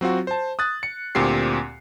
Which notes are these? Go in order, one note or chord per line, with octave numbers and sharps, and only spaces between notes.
F#3 C4 F4 F#4
C5 A5
D#6 F#6 A6
C#7
D2 A#2 C4 G4 C7